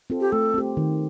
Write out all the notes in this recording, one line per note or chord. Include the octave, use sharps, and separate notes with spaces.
C4 F4 A4
G4
A3 A4
C4 G4
D#3